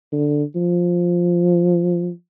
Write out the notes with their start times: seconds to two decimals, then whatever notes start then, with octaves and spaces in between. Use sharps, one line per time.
0.13 D3
0.56 F3